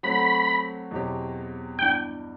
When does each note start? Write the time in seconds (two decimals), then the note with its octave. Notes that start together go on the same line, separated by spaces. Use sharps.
0.03 F#3 A3 C4 F#4 B5
0.91 E2 B2 F#3 C4 G4
1.79 G2 E3 B3 D4 G5